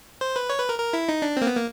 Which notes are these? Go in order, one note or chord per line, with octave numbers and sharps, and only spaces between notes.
C5
B4
C#5
B4
A#4
A#4
E4
D#4
D4
A#3 C4
B3
A#3